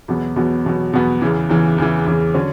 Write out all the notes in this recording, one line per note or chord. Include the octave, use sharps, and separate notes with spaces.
E2 B2 F#3 B3
E2 B2 F#3 B3
E2 B2 F#3 B3
E2 B2 F#3 B3
E2 C#3 E3
E2 C#3 E3
E2 C#3 E3
E2 C#3 E3
D3 F#3 C#4